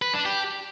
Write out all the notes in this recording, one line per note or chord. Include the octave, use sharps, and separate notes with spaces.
B4
D4
G4